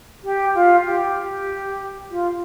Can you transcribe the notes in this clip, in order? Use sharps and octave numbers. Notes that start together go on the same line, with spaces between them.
G4
F4
G4
G4
F4